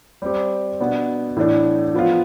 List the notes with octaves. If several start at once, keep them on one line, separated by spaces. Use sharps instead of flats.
G3 C4 G4
B2 B3 D4
A2 E3 A3 D4
F3 B3 F4